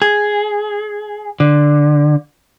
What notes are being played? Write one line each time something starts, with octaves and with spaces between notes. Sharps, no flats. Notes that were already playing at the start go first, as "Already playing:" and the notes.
G#4
D3